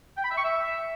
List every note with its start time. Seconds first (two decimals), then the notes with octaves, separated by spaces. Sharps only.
0.18 G5
0.25 B5
0.31 E5
0.38 C#6
0.45 E5